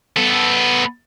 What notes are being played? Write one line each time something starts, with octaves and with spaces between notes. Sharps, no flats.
B3 A4